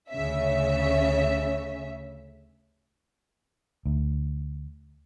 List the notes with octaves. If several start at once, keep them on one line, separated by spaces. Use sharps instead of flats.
D2 C#3 C#4 E5
D2